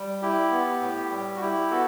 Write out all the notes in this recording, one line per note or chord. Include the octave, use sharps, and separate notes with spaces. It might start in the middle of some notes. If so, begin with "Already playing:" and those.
Already playing: G3
E4 G4
B3
A2
G3
F#4
E4 G4
B3 F#4 A4